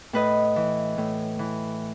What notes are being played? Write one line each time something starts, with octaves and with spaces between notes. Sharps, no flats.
A2 B4 D#5
E3
A2
E3